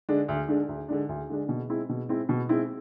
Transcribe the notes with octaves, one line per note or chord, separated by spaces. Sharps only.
D3 G#3 D4
D2
D3 G#3 D4
D2
D3 G#3 D4
D2
D3 G#3 D4
B2
G#3 C4 E4
B2
G#3 C4 E4
B2
G#3 C4 E4